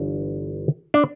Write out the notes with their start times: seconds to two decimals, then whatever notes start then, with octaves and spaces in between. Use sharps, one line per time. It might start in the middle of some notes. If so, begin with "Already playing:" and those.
Already playing: G1 G2 E3
0.94 D4